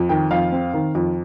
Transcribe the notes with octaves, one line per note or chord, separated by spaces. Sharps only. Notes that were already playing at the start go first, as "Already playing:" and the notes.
Already playing: F2
D#3 G5
F2 F5
C4
D#3
F2